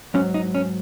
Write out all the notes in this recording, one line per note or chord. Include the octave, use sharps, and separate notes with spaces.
G#2 F#3 C#4
D#4
C#4